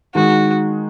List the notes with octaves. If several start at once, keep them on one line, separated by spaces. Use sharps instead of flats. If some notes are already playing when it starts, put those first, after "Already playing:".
D#3 G#3 D#4 F#4